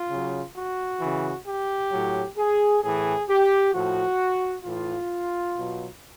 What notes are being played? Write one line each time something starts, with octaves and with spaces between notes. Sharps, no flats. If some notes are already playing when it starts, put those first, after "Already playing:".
Already playing: F4
C#3 F#3
F#4
C#3 E3
G4
A2 F#3
G#4
A2 E3 G#4
G4
A2 F3 F#4
A2 E3 F4
B2 F#3